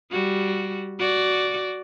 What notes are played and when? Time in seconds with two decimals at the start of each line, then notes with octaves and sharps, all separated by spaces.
0.11 G3 F#4
0.99 F#4 D5